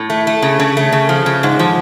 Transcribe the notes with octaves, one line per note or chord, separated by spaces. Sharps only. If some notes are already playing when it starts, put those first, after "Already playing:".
Already playing: A2
A3
A3
C#3
C#3
A3
C#3
F3
C#3
G#2
F3